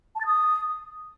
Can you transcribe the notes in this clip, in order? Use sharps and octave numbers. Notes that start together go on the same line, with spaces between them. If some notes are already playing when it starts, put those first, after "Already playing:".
A5
A6
D#6